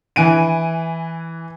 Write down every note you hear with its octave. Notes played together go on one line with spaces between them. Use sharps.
E3 G#5 D7 D#7